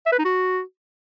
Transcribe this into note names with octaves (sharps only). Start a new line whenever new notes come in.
E5
B4
D#4
F#4